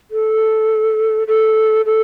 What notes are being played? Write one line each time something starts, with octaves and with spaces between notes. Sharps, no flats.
A4
A4
A4